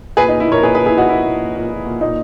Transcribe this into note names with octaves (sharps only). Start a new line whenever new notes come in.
A#2 G#4 B4
D#4
A#2
E4
A#2 A#4 C#5
A#2 G#4 B4
G#4 B4
A#2
E4 G#4
A#2 D#4 F#4
A#2 E4
A#2
A#2
A#2
A#2
A#2
A#2 D#4